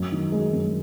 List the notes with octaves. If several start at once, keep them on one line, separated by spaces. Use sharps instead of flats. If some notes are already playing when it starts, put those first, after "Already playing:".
Already playing: F#2
D#3
G#3
F#2